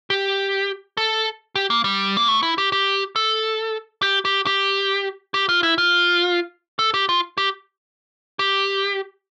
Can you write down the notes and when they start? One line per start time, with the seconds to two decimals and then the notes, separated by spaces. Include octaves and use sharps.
0.10 G4
0.97 A4
1.56 G4
1.70 A#3
1.84 G3
2.17 A#3
2.28 A3
2.43 E4
2.58 G4
2.72 G4
3.16 A4
4.02 G4
4.25 G4
4.47 G4
5.34 G4
5.49 F4
5.63 E4
5.78 F4
6.79 A4
6.94 G4
7.09 F4
7.38 G4
8.39 G4